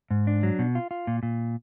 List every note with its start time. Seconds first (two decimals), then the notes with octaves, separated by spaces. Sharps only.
0.11 G#2
0.27 D4
0.43 F#3
0.59 B2
0.75 F4
0.91 F4
1.07 A#2
1.23 A#2